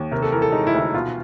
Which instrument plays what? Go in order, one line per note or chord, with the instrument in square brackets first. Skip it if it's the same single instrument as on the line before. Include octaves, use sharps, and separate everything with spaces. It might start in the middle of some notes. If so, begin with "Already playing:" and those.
Already playing: [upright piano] D#2
C3 A#4
A4
E3 A#4
A4
G#3 D#4
E4
D2
E4
B2 F4